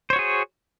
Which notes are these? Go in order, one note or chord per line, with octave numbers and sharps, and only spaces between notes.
F#4 G#4 C5 C#5